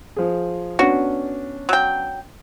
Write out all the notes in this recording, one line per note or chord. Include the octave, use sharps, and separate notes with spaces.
F3 G#4
B3 C#4 D4 F#4
F#3 G5